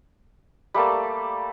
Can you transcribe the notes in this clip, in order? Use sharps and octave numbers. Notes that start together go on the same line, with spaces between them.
G3 A3 A#3 A5